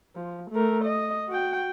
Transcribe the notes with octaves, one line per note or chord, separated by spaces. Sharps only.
F3
A3 A#4
D#5
F#4 G5